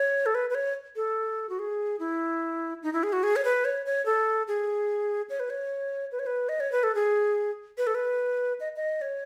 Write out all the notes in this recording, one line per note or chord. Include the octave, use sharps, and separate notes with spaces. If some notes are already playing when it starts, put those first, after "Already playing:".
Already playing: C#5
A4
B4
B4
C#5
A4
F#4
G#4
E4
D#4
E4
G#4
F#4
G#4
C#5
B4
C#5
C#5
A4
G#4
C#5
B4
C#5
B4
C#5
B4
D#5
C#5
B4
A4
G#4
B4
A4
B4
D#5
D#5
C#5